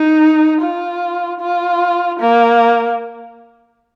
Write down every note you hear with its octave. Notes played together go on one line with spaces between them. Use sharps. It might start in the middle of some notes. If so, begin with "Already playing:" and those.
Already playing: D#4
F4
F4
A#3